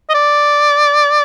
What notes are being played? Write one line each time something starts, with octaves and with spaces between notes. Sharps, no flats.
D#5
D5